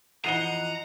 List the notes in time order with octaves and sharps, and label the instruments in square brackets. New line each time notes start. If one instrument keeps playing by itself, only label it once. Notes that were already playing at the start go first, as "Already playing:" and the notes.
[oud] F2 E3 D#5 [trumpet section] F#5 [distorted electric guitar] A#5 [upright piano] C7 D#7 G7